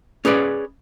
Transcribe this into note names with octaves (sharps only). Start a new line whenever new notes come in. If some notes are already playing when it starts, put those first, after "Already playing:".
C#4 G#4 B4 D5